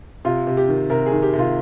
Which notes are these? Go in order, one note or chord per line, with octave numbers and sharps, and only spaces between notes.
C3 F4
C3
G4
D#3
C3 A#4
G#4
D#3
G4
C3
F4